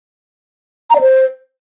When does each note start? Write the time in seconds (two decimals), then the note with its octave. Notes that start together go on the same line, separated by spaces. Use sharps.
0.90 A#5
0.96 D5
1.01 C5